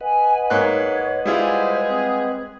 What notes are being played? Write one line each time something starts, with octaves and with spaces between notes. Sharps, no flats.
B4 D#5 F#5 G#5
G#2 A#3 C#5 F#6
G3 G#3 E4 F4 G#4 C5
C4